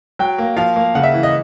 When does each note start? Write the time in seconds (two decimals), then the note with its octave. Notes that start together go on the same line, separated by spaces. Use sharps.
0.19 F#3 G5
0.38 A#3
0.56 F3 F5
0.76 A#3
0.95 C#3 F#5
1.03 E5
1.14 E3
1.23 D#5